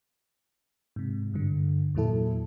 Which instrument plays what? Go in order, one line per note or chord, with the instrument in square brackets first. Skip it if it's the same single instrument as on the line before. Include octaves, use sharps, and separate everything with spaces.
[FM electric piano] G#2 C3
G2 D3
E2 A#2 F#3 E4 A4